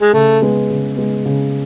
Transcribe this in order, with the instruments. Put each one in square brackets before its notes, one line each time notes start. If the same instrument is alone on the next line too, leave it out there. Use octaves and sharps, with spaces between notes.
[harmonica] G#3
[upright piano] C#3 [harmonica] A3
[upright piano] G#3 B3
C#3
G#3 B3
C#3